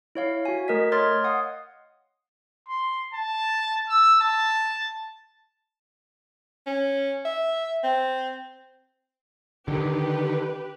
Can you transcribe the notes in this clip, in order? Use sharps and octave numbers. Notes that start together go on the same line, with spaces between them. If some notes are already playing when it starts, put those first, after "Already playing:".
E4 C#5 F5
F#4 G#5
A3 A#4 D#5 B6
C#5 D#5 C6 F6 G#6 A6
F5 F#5 D#6
C6
A5
E6
A5
C#4
E5
C4
D3 D#3 G4 B4